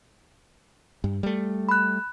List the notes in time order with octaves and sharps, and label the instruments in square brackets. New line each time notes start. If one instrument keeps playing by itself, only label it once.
[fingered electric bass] G2
G3 A3
[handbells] B5 F#6